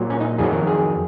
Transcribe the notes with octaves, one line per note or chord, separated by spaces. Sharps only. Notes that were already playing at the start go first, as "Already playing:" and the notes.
Already playing: A#2 F#3
C#4
D#4
F2 D#3 F#3 G#4
A#4
G#4